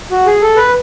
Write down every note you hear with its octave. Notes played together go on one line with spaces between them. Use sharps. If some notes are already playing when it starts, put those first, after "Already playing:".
F#4
G#4
A4
B4